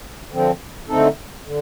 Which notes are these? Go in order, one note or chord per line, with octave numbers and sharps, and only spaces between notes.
D3 F3 C4
D3 A3 C4 D#4 A4
D3